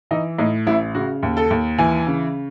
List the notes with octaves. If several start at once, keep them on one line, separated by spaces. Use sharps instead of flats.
E3 D#4
A2 D#4
A1 E4
C#3 F#4
D#2
A4
D#2
E3 G#5
C#3